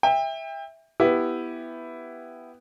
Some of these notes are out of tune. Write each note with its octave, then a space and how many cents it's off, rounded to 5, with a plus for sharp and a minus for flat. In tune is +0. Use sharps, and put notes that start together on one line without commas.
E5 -10 G5 +30
B3 +5 E4 +5 G4 +0